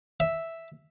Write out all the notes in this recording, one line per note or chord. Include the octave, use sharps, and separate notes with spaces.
E5